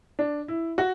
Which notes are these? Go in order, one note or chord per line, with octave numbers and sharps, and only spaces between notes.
D4
E4
F#4